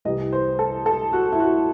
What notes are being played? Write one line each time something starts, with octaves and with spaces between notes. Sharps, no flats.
C2 C3 E3 G3 D#5
C5
A4
A4
F#4
E4
F#4